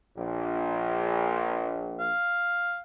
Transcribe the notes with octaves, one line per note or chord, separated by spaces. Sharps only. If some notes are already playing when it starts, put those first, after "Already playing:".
A#1
F5